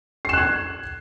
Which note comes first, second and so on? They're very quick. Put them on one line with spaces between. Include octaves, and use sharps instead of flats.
C7 E7 F#6 G#6